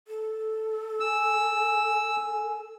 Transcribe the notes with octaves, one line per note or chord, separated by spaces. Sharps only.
A4
G#5 E6